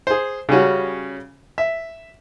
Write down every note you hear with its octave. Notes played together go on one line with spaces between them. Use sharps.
G#4 C5
C#3 G3 C#4 F#4
E5